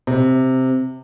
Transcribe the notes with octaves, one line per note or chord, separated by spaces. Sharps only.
C3